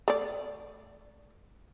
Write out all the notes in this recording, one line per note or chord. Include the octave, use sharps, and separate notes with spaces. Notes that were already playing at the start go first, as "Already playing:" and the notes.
A3 D5